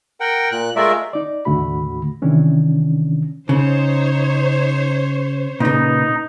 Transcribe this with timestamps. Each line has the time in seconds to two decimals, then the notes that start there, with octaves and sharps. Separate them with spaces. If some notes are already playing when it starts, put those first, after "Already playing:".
0.20 A#4 F#5 G5
0.52 A#2 F#6
0.76 G#3 A3 F4 A#4 D5 E5
1.13 D#4 D5
1.45 D#2 A2 D3 A3 F#4 B5
2.22 C3 D#3 E3 C#4 D4
3.49 C#3 D#4 C5 C#5
5.60 A#2 C#3 D#4 B4